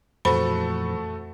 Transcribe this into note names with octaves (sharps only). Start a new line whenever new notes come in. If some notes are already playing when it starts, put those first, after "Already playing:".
F2 A#2 E3 A3 F#4 A4 C5 B5